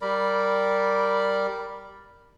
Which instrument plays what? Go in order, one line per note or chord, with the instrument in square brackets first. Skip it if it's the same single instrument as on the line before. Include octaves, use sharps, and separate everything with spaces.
[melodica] G3 A#4 D5 B5